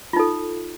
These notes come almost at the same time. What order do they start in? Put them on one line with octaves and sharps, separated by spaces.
F4 D#4 A4